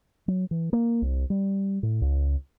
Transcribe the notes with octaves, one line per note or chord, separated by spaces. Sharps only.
F#3
E3
A#3
C2
G3
A2
C#2